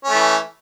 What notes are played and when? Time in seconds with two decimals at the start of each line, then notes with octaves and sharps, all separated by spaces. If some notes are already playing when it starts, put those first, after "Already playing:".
0.05 C#4
0.09 A3
0.14 E3